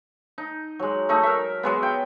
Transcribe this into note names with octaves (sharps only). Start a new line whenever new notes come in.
D#4
F#3 G#3
A3 D#4
A#4 E5
F#3 G#3 B3
G5